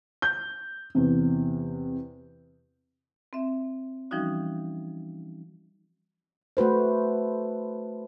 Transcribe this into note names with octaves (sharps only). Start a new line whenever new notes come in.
G6
E2 C3
C4 E5
E3 F3 G3 C#4 D#4 F#4
A3 F#4 B4 C5